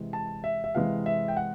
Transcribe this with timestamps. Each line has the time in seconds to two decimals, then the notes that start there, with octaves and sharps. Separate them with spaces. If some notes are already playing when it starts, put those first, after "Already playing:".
Already playing: C3 E3 G#3
0.13 A5
0.44 E5
0.64 E5
0.75 C3 E3 G#3 F5
1.06 E5
1.28 G5
1.37 F#5